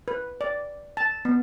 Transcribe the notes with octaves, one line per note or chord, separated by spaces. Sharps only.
B4
D5
A5
B3